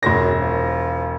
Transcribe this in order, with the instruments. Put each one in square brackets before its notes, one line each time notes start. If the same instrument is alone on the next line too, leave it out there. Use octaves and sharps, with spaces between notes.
[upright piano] E1 A#6 [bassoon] F#2
[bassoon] F3